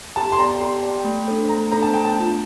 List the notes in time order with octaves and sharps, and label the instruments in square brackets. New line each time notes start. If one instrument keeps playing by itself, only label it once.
[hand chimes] G4 [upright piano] A5
[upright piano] C6
[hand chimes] D5 G5 [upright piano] A#5
[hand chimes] G4 [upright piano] C6
[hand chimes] D5 G5
A3
D4 A4 C5
[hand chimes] A3 [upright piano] A#5
[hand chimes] D4 A4 C5 [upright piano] A#5
[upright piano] A5
[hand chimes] A3 [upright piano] G5
[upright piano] A5
[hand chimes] D4 F4